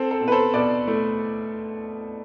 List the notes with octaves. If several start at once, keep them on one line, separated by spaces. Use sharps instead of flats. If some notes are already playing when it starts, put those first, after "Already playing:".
Already playing: C4 A4 C5
A4
B2
B4
A4 C5
B2 B4 D5
A3